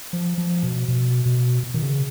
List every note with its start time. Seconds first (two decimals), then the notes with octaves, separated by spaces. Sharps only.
0.13 F3
0.38 F3
0.63 B2
0.88 B2
1.26 B2
1.63 B2
1.74 D#3
1.82 C#3